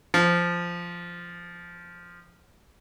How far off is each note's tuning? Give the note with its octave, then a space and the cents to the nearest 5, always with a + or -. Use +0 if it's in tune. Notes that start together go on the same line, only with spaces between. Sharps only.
F3 -10